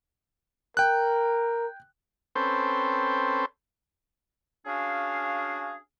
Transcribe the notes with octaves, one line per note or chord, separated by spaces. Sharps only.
A#4 G5 F#6
C4 C#4 A4 B4 C5 G5
C#4 D4 F#4 G#4 F5